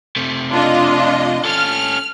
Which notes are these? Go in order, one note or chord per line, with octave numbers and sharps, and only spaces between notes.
C3 A3
D4 F4 D#5
C#4 A4 F6